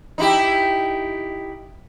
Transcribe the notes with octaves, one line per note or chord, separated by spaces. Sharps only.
D#4 E4 G4